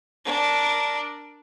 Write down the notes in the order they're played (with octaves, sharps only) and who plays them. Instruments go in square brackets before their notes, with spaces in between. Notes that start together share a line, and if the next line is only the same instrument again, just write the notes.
[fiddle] D4 A#4